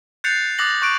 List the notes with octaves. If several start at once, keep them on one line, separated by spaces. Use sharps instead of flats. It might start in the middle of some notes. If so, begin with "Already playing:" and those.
F#6 G6 A6 C7 C#7 F7
D6 D#6 F#6 A6 A#6 F#7
C#6 F#6 D7